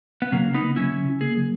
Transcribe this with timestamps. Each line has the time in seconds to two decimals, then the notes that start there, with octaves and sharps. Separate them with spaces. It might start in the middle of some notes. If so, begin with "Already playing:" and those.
0.22 B3
0.32 C#3 F#3 A#3
0.48 C#3
0.54 B3 D#4
0.63 A#3
0.76 F#3 C#4 E4
0.92 C#3
1.06 C#3
1.21 A#3 G#4
1.36 F#3